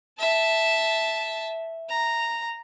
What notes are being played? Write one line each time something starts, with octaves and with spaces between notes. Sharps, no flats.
E5 A5
A#5